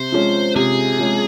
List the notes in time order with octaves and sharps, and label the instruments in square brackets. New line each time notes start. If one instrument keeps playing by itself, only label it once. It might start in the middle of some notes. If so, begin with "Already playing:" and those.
Already playing: [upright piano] C3 [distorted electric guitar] C5
[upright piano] F3 G#3 C#4
[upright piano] C3 [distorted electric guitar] G#4
[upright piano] F3 G#3 C#4